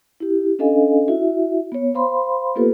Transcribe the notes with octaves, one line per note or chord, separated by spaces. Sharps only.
E4 G4
C#4 D4 A4 D#5 F5 G#5
E4 F#4 E5
B3 C#5
C5 F5 B5 C6
A#3 B3 F4 G4 A4 B4